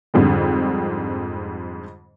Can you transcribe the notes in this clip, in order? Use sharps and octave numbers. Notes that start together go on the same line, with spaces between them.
F2 G#2 D3 G3